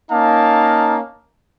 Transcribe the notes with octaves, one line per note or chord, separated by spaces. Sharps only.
A#3 C#4 D#4 F5 A5